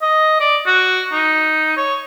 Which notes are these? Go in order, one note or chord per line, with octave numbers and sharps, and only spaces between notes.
D#5
D5
F#4
D#4
C#5